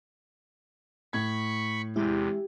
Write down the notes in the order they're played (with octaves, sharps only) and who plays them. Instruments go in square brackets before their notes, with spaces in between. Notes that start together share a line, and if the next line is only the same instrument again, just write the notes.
[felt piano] A2 G#6 [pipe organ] B5 C#6
[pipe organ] E2 C3 [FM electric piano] G#3 E4 [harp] G4